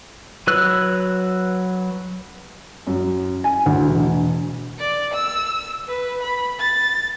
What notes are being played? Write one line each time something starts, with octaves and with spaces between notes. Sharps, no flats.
F#3 B4 E6 F#6
F#2
G#5
D2
E1
D5
E6
B4
B5
A6